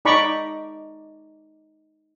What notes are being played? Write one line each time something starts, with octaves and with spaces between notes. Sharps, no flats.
D#4 D5 A#5 B5 C#6 D6